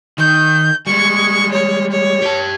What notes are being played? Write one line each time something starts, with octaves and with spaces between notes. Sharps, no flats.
D#3 G6
G3 G#3 C#6
C#5
C#5
G4 A5